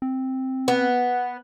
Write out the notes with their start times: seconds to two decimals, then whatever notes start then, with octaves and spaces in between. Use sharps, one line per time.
0.02 C4
0.68 B3